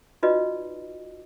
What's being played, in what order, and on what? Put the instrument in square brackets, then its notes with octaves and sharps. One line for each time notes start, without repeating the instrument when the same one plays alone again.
[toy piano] D#4 F4 F#4 B4 D5 D#5